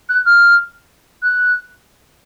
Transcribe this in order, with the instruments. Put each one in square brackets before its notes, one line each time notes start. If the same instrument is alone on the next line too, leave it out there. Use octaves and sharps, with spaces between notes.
[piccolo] F#6
F6
F#6